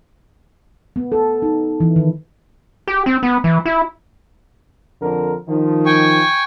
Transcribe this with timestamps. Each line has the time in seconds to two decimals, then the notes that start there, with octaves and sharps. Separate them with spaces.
0.96 B3
1.12 A4
1.42 D#4
1.80 E3
1.96 D#3
2.88 G4
3.06 C4
3.23 B3
3.44 E3
3.65 E4
5.02 F2 D3 A#4
5.48 D#3 F3
5.86 G5 G#5 C#6